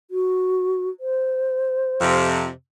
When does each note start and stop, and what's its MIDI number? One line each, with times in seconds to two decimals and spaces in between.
0.11 0.89 66
1.00 2.27 72
2.01 2.49 41
2.01 2.49 48